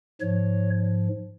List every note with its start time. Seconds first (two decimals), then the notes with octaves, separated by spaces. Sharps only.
0.21 G#2 F3 C#5